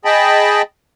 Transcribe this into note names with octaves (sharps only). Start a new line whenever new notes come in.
G#4 D#5 G5 A5 B5